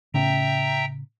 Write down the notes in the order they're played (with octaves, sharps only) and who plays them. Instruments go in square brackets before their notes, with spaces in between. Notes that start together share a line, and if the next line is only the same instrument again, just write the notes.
[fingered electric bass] A2 C#3 C#4 [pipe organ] E5 G5 A#5